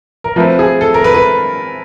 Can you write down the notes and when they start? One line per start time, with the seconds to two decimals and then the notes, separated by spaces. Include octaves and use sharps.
0.24 A#4
0.36 F3 A3 C4 B4
0.59 G#4
0.81 A4
0.94 A#4
1.04 B4
1.14 B4